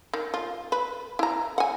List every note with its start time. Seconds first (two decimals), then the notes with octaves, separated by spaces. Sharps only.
0.13 D#3
0.34 F4
0.72 B4
1.19 E4 A#5
1.58 F#5 G#5